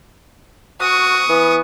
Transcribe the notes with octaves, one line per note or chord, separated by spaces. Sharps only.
F#4 C#6 D#6
E3 B3